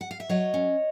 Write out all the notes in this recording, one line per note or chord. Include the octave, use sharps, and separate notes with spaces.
F#5
F5
E5
F#3 C#5 D#5
C#4